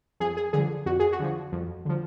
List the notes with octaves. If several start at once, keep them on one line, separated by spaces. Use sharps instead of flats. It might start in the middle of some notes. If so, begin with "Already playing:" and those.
F2 G#4
G#4
D3 F3 G#4
F2 F#4
G#4
F#4
D3 F3
F2
D3 F3